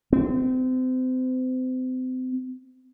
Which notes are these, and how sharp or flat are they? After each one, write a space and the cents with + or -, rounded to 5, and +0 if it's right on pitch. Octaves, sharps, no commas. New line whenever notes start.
C4 -35